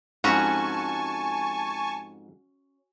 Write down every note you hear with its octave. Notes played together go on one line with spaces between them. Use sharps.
F2 G#2 C#4 F#4 G#5 A5 C#6